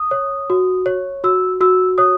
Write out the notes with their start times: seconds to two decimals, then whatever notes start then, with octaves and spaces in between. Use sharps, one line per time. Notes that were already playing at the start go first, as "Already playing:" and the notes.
Already playing: D#6
0.11 C#5
0.50 F#4
0.86 C#5
1.24 F#4 E6
1.61 F#4 E6
1.98 C#5 D#6